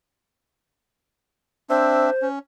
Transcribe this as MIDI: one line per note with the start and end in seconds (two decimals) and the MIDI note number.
1.70 2.10 60
1.70 2.10 62
1.70 2.28 72
1.70 2.10 76
2.22 2.39 61